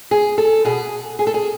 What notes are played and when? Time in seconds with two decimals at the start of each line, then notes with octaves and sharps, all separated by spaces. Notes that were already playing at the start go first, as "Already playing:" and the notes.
0.11 G#4
0.38 A4
0.65 B2 G#4
1.19 G#4
1.27 A4
1.34 G#4